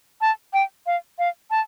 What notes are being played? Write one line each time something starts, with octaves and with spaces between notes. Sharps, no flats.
A5
G5
F5
F5
A5